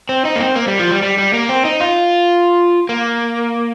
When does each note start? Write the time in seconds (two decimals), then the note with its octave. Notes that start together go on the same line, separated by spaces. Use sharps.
0.09 C4
0.25 D#4
0.36 A#3
0.41 C4
0.55 A#3
0.68 G3
0.79 F3
0.91 G3
1.02 G3
1.18 G3
1.33 A#3
1.49 C4
1.65 D#4
1.81 F4
2.89 A#3